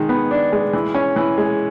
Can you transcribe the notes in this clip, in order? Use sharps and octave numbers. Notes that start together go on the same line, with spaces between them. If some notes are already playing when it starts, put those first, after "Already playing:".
Already playing: D#3 G#3
B3
D4
G#3
E3
C#4
E3
G#3